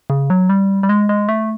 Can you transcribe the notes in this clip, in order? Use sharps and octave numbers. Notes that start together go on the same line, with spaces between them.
C#3
F#3
G3
G3
G#3
G#3
A3